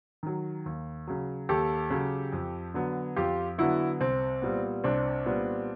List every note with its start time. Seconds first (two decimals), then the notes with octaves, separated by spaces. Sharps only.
0.23 D#3 F#3
0.66 D#2
1.08 C#3 F#3
1.49 D#2 G4 A4
1.90 C#3 F#3
2.33 F2
2.74 D3 F#3 B3
3.16 F2 F4 G4
3.58 D3 F#3 B3 E4 F#4
4.00 C2 C4
4.42 A#2 G3 B3
4.84 C2 C4 D4
5.26 A#2 G3 B3